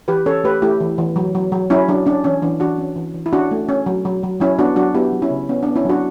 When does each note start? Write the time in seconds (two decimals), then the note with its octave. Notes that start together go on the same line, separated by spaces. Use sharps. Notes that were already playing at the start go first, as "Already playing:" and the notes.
0.08 E3 G4 B4
0.26 C#4 A4 C#5
0.44 A3 G4 B4
0.62 A3 E4 G4
0.80 E3
0.98 E3
1.16 F#3
1.35 F#3
1.52 F#3
1.70 F#3 C#4 E4
1.88 F#3 D4
2.06 C#4 D4
2.24 E3 C#4
2.42 E3 D4
2.60 E3 D4 F#4
2.79 C#4
2.96 E3
3.14 E3
3.26 E4
3.33 C#4 D4 F#4
3.51 A3
3.69 C#4
3.86 F#3
4.05 F#3
4.23 F#3
4.40 F#3 C#4 E4
4.58 B3 D4 F#4
4.76 F#3 D4 F#4
4.94 B3 E4 G4
5.13 F#3
5.22 C#4 E4
5.30 C#3
5.49 B3 C#4
5.63 B3 D4
5.76 C#4 E4
5.85 F#3 D4 F#4